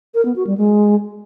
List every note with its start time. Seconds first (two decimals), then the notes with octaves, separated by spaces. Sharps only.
0.14 A#4
0.25 B3
0.36 F#4
0.47 G3
0.58 G#3